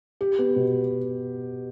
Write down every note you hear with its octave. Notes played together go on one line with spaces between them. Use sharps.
G4
B3
B2